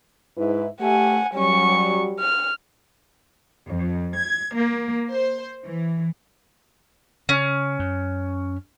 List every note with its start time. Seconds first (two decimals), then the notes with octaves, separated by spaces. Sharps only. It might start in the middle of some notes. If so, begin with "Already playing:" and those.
0.38 G#2 E4 B4
0.81 A3 G4 F#5 G#5
1.34 F#3 G3 C#4 C#6
2.19 F6
3.70 F2
4.18 G#6
4.56 A#3
5.10 C5
5.65 E3
7.29 C#3 C#4
7.79 F#2